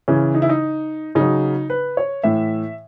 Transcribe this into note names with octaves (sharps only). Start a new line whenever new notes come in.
C#3 E3 C#4
D#4
E4
D#4
C#3 F#3 D#4
B4
C#5
A2 E3 E5